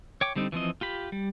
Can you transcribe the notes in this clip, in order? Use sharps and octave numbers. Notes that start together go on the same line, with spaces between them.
C#5 G5 D6
D3 G3 C4 D#4
E3 F3 C4 D#5
F4 G4 B5
G3